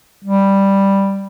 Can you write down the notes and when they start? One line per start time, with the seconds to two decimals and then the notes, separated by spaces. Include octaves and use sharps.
0.24 G3